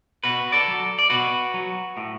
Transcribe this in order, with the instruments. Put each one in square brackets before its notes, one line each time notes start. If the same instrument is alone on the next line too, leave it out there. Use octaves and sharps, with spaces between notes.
[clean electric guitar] B2 F#4 B4
A4 D5
F#3
D5
B2 F#4 B4
F#3
A2